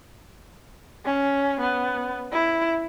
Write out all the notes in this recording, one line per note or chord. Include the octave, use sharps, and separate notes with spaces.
C#4
B3
E4